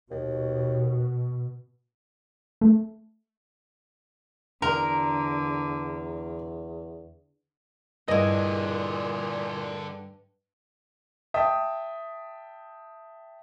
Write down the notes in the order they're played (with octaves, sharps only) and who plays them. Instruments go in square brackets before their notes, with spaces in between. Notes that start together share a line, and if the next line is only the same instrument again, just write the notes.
[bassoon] D#2 [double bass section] B2
[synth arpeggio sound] A3
[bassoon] E2 [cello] D3 [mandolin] A#4 [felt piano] A#5
[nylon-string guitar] G2 [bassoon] A#2 [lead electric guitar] D3 G#4 [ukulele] E4 D#5
[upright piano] E5 G5 A5 D#6